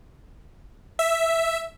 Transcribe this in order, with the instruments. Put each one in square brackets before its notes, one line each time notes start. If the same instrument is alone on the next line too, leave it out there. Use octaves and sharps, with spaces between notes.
[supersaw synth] E5